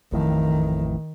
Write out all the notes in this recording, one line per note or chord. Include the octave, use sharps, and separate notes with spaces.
A1 F2 A2 D#3